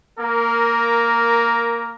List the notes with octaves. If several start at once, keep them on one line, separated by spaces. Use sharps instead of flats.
A#3 A#4